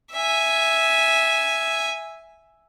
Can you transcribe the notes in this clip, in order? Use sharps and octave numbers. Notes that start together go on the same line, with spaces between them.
E5 G#5